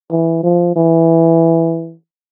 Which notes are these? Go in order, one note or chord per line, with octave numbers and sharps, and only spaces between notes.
E3
F3
E3